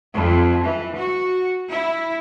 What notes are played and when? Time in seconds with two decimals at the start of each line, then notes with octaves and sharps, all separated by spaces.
0.15 F2
0.63 E3
0.95 F#4
1.69 E4